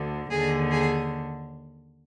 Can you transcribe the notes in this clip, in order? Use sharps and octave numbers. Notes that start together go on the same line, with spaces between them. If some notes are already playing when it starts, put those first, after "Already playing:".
Already playing: D2 D3
D#2 D3 G#4
G#4